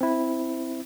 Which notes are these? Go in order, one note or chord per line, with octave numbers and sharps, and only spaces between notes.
C4 E4